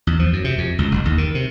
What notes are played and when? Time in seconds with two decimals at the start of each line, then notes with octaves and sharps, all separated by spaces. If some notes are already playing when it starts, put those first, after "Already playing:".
0.07 E2
0.19 F3
0.33 F#2
0.44 C3
0.58 F2
0.78 C#2
0.92 F#1
1.05 D#2
1.18 D#3
1.35 C3